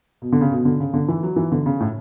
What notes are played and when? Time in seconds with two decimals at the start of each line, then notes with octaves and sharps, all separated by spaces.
0.22 B2
0.32 D3
0.41 C#3
0.51 B2
0.65 D3
0.80 C#3
0.94 D3
1.08 E3
1.23 F#3
1.36 E3
1.52 D3
1.66 C#3
1.80 A2